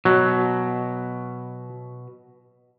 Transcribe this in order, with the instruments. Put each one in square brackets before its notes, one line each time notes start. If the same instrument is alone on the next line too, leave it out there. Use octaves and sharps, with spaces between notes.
[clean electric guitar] B2 [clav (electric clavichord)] F#3